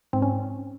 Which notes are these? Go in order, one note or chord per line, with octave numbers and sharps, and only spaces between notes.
G#2 C4
C#4